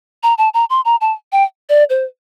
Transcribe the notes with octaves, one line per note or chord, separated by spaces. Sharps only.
A#5
A5
A#5
C6
A#5
A5
G5
D5
C5